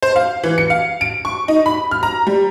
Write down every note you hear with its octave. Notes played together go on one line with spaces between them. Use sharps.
C5
F5
E3
C#7
F5
D7
C#6
D#4
B5
F6
A#5
G3